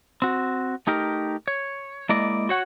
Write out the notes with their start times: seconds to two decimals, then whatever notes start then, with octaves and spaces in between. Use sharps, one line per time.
0.22 C4 F#4
0.87 A3 D#4 G4 A#4
1.48 C#5
2.09 G#3 A#3 E4 D5 D#5
2.49 F#4 C#5 F#5